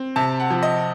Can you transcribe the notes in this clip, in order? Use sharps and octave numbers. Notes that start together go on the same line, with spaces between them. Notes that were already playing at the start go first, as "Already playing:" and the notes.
Already playing: C4
C3 A5
F#5
F3
D#5